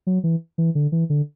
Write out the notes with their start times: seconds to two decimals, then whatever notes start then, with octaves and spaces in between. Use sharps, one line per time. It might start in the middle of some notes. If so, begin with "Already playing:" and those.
0.07 F#3
0.24 E3
0.58 E3
0.75 D3
0.92 E3
1.10 D3